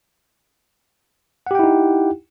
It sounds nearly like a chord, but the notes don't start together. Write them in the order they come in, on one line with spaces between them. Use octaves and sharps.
F#5 G4 G5 E4 D#4